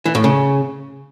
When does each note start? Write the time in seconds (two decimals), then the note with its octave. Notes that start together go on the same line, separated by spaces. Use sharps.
0.05 E3
0.15 A2
0.24 C#3